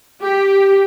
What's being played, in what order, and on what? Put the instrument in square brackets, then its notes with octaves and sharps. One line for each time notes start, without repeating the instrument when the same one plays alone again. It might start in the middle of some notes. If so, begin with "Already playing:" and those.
[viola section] G4